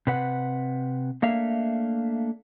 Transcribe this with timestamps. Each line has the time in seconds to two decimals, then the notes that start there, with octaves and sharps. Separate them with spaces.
0.07 C3 B4 F#5
1.22 A3 A#3 D4 E5 F5